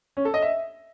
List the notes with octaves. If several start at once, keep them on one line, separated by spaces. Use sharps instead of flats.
C#4
A4
D#5
E5